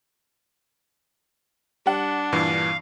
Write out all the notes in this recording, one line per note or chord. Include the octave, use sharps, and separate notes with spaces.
G3 D4 F#5
G2 A#2 E3 F5